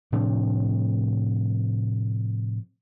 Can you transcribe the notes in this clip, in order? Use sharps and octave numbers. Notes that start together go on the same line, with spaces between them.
A2 C3 F3 D4